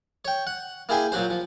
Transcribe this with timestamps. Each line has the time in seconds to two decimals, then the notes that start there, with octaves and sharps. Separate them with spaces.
0.25 C#5 G5
0.47 F#5
0.89 A#3 E4 G#4 G5 G#5
1.12 A#2 F#3 F#4 C5
1.30 F3